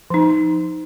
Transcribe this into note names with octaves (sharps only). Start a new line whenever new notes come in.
F3 D#4